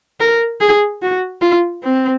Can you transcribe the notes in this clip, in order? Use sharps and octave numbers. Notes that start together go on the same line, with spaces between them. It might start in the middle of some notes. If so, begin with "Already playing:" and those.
A#4
G#4
F#4
F4
C4